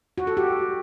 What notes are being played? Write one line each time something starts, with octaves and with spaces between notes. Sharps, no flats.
F#4
A4
G4